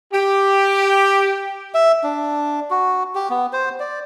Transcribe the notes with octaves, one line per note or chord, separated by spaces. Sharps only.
G4
E5
D4
F#4
G4
B3
C5
D5